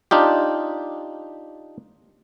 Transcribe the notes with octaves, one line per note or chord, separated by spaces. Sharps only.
D4 D#4 F4 G4